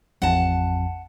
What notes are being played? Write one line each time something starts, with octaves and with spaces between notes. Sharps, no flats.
A1 F2 F#5 A5